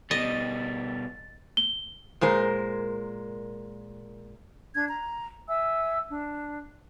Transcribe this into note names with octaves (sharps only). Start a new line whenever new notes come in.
B2 G3 D#5 A6
G7
A#2 G#3 A#4 C5
D4 G#6
A#5
E5 G#5 E6
D4